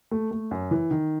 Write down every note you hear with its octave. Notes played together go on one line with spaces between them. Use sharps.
A3
A3
F#2
E3
D#3